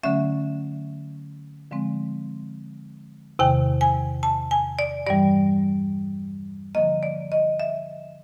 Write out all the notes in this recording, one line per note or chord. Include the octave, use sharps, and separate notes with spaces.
D3 F#3 A3 C#4 E5
D3 F3 G#3 C4
E2 C3 D#3 G5
G#5
A5
G#5
D5
G2 E3 G3 D5
D3 F3 A#3 D#5
D5
D#5
E5